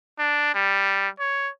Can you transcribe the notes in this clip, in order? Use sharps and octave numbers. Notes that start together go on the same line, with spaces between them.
D4
G3
C#5